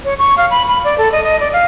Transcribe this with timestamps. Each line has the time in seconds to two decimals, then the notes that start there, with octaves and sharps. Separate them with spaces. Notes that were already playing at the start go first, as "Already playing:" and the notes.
0.05 C#5
0.19 C#6
0.38 F5
0.51 B5
0.69 B5
0.84 D5
0.98 A4
1.12 D#5
1.24 D#5
1.40 D5
1.53 F5